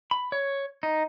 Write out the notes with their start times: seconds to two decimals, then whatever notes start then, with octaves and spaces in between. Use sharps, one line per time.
0.11 B5
0.32 C#5
0.83 D#4